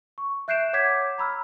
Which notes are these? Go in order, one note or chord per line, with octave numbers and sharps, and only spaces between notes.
C#6
E5 F#6 G6 C7 D7 E7
C#5 F#5 D6 G6 G#6 B6
A#5 B5 E6 F6